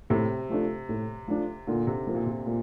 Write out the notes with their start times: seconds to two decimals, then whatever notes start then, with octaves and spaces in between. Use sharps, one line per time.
0.10 A2 C3
0.50 F3 A3 D4
0.89 A2
1.28 F3 A3 D4
1.67 A#2 D3
1.87 C3
2.07 F3 A#3
2.14 A#2
2.26 C3
2.46 A#2